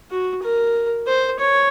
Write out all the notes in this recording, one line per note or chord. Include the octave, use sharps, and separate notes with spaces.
F#4
A#4
C5
C#5